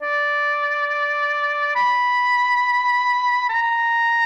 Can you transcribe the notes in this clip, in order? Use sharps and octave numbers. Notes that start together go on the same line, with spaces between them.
D5
B5
A#5